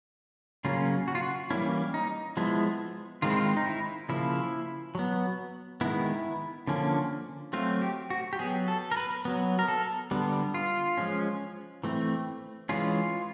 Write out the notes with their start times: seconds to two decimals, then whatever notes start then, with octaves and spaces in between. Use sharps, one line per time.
0.65 C#3 F#3 A#3 C#4 F4
1.08 F#4
1.15 F4
1.23 F#4
1.50 E3 G3 A#3 C#4 E4
1.94 D#4
2.37 F3 G#3 B3 E4
3.22 D#3 G#3 C4 F4
3.30 E4
3.37 F4
3.57 D#4
3.66 E4
4.09 C#3 F3 A#3 E4
4.95 F#3 B3
5.81 D#3 G#3 B3 E4
6.67 D3 F3 A#3 C#4
7.53 F#3 A3 C4 F4
7.82 G4
8.10 F#4
8.33 G4
8.39 F#3 B3 G#4
8.68 A4
8.91 A#4
8.97 B4
9.25 F#3 B3
9.59 A#4
9.68 A4
10.11 D3 G3 B3
10.54 F4
10.97 F3 G#3 C#4
11.84 E3 A3 C4
12.69 E3 G#3 C#4 F4